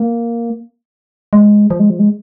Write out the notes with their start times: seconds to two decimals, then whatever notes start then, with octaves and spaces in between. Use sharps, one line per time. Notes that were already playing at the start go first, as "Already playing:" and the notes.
Already playing: A#3
1.33 G#3
1.70 F3
1.79 G#3
1.90 F3
1.99 G#3